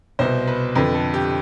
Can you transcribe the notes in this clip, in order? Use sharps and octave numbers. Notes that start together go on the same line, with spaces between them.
C2 B2 C5
B4
F2 D3 B4
A4
G4